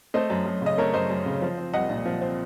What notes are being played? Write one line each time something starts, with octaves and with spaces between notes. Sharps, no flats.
A3 C5 D#5
F#2
F#2
C#3 D#5
A3 A#4 C#5
F#2 C5 D#5
F#2
C#3
F3
C4
C2 D#5 F#5
A#2
F3
C4